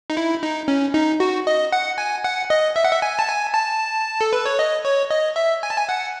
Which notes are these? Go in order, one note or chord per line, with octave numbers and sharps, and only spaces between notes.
D#4
E4
D#4
C#4
D#4
F#4
D#5
F#5
G#5
F#5
D#5
E5
F#5
E5
G#5
A5
G#5
A5
A4
B4
C#5
D#5
C#5
D#5
E5
G#5
A5
G#5
F#5